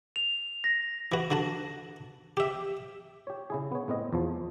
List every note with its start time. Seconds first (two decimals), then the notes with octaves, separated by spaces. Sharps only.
0.16 F7
0.64 A#6
1.12 E3 F#4
1.31 D3 F#4 A5
2.37 G4 E5
3.27 G4 C#5
3.50 C#3 E4 G#4
3.72 B3 C#5
3.88 A2 B3 C4 D#5
4.13 E2 F3